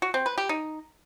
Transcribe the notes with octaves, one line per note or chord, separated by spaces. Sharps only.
F#4
C4
B4
G4
D#4